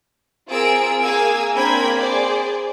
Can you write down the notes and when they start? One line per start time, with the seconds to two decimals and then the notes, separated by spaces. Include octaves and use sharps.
0.48 C4 F4 G#4 A#4 E6 D7
1.00 A#3 G#4 F5 G#5 E6 G#6
1.53 A#3 C4 D4 G5 B5 G#6
1.97 G#4 C5 D5